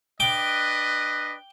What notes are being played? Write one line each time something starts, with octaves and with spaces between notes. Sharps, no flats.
D4 B4 D#5 G5 D6